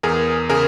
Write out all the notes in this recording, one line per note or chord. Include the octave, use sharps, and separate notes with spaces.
E2 G#4 A#4
C#3 G#4 A#4